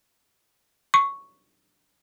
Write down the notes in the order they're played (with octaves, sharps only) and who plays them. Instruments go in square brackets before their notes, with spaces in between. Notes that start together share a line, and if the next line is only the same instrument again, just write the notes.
[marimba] C#6